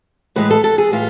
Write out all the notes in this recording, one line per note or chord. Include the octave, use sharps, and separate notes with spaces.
A2 E3 G#3 B4
A4
A4
G#4
A2 E3 F4